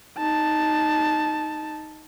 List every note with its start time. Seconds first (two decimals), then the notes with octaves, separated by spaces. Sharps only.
0.18 D#4 A5